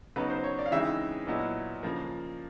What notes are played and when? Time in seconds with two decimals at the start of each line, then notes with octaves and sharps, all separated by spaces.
0.16 C#3 F#3 B3 D#4 B4
0.30 C5
0.44 C#5
0.59 D5
0.66 F5
0.71 C#3 E3 G#3 C4 D#4 E5
1.27 A#2 F#3 B3 E4 D#5
1.83 C#3 F3 A#3